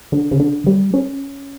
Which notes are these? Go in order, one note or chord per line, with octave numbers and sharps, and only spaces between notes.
D3
C#3
D3
G3
C#4